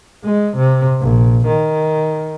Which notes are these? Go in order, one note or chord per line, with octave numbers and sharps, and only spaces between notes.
G#3
C3
A#1
D#3